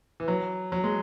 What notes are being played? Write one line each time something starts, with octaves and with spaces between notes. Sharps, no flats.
E3
F#3
F#3
G#3